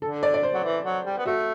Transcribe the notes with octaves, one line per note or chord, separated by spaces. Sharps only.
D3 A4
D5
D5
C5
F#3
E3
F#3
G3
B3
A3 F#4